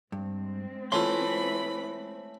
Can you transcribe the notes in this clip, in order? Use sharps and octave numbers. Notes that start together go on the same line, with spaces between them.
G2 G#3 C4
E3 A3 C#4 F4 B5 C6